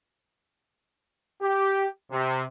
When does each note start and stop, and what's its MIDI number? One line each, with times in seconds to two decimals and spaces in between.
1.42 1.87 67
2.11 2.43 48